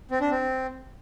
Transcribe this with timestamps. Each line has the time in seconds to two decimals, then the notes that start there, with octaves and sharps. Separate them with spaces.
0.11 C4
0.21 D4
0.31 C4